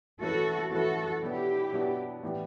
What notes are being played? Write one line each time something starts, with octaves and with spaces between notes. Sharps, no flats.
E3 A3 C#4 E4 F#4 A4 B4
E3 A3 C#4 E4 F#4 A4 B4
B2 F#3 B3 D4 E4 F#4 G4
B2 F#3 B3 D4 F#4
A2 E3 B3 D4 G4